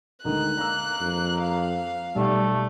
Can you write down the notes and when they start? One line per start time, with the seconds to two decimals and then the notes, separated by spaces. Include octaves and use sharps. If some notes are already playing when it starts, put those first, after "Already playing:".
0.25 D2 D#3 G#3 D#4 F#6
0.58 A#3 A#5 E6
1.01 F2
1.42 F5
2.16 B1 G3 A3